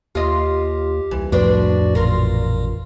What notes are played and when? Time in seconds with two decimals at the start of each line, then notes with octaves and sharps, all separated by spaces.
0.15 D#2 F4 G4 D#5
1.11 C2 E3
1.32 F2 A2 D4 F#4 B4 C5 D5
1.95 A1 A#2 F4 A#4